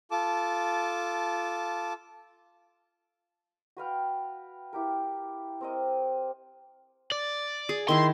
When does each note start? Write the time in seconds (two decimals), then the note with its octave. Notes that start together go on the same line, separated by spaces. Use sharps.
0.11 F4 A4 A5 D6
3.77 F#4 B4 F5 G5
4.73 E4 G4 A#4
5.61 C4 A#4 D#5
7.12 D5
7.69 G#4
7.89 D#3 E4 G#4 C6